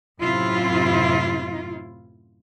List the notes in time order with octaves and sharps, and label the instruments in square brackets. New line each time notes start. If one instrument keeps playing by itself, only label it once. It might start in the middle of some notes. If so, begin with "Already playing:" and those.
[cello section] F#2 A2 C3 E4 F4